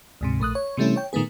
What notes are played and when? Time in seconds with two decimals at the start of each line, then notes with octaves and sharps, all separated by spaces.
0.21 D2 G#2 C3
0.40 A#1 A3 D#6 F#6
0.55 C#5
0.77 C3 E3 G3 A3 C#4 E4
0.96 C#5 G5
1.13 A#2 D#3 A3 B3 G#4